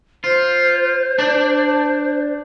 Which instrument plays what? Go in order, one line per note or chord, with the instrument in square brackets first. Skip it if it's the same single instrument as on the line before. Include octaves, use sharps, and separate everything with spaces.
[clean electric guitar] F4 [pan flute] C5
[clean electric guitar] D4 D5